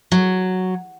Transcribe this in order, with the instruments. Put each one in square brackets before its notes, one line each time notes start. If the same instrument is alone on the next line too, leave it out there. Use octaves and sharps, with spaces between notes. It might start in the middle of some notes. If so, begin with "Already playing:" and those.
[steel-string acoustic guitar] F#3